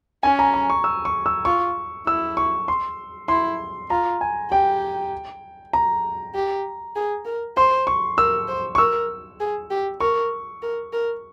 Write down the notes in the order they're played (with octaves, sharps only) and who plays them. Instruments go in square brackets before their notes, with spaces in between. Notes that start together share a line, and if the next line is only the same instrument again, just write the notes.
[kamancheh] C#4 [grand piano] G#5
[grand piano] A#5
A#5
C#6
E6
C#6
E6
[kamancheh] F4 [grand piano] C#6
[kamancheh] E4 [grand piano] E6
[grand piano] C#6
C6
[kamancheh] E4 [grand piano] C6
[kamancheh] F4 [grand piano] A#5
[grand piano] G#5
[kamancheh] G4 [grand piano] G5
[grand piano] A#5
[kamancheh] G4
G#4
A#4
[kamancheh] C5 [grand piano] C6
[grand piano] C#6
[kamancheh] A#4 [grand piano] E6
[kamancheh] C5
[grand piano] C#6
[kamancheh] A#4 [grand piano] E6
[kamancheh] G#4
G4
[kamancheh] A#4 [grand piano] C#6
[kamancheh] A#4
A#4